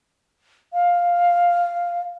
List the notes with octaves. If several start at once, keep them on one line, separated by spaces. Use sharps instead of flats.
F5